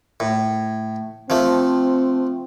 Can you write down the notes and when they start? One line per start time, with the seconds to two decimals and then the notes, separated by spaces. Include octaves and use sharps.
0.20 A2
1.30 F3 A3 C4